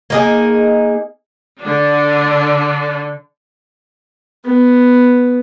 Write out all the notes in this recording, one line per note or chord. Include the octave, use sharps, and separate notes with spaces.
A#3 D#4 G#4
D3 D4
B3